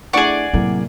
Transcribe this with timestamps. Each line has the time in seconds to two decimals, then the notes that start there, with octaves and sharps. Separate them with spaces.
0.13 A3 D4 E4 G#4 D5 F#5 C#6
0.53 A2 C3 F#3 A#3